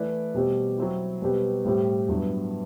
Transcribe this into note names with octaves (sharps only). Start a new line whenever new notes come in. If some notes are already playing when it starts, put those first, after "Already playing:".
Already playing: E3 A3 E4 B4 D5
B2 G3 C4 G4
F#3 C4 E4
B2 G3 C4 G4 B4
A2 G3 C4 G4
G2 F#3 B3 E4 B4